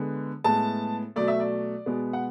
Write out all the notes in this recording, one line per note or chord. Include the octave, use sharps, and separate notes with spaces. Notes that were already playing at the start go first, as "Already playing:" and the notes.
Already playing: D3 G#3 B3
A2 G#3 B3 A5
B2 F#3 A3 D5
E5
D5
B2 G#3 B3
F#5